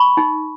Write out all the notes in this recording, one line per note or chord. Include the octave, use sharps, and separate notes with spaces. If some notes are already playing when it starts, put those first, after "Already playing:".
Already playing: B5 C#6
D#4